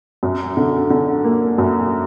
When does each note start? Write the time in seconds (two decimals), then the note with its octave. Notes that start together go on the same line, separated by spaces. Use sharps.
0.23 F#2
0.57 D3
0.90 D3
1.24 A#3
1.58 F#2